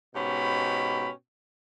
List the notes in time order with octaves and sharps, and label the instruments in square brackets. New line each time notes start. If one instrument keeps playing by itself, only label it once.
[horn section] G#2 B2 C#4 G4 B5